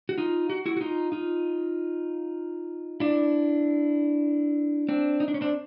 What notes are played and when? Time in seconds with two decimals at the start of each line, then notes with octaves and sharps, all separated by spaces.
0.09 F#4
0.18 D#4 F4
0.50 F#4
0.66 E4 F#4
0.77 F#4
0.81 D#4 F4
1.12 D#4 F4
3.00 D4 E4
4.89 C4 D4
5.20 D#4
5.28 D4
5.34 C#4
5.41 C4 D4